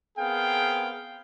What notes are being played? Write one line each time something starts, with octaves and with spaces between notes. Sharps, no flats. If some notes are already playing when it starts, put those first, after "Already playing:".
B3 C4 G#4 A#4 F5 G5